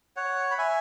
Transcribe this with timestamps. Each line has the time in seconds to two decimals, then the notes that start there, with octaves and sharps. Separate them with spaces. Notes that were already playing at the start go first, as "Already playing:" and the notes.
0.17 C#5 F#5
0.51 B5
0.58 E5 G#5